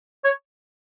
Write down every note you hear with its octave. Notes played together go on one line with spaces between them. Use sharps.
C#5